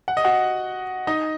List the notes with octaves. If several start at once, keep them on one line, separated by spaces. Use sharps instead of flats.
F#5
D#5
F#4 F#5
D#4 D#5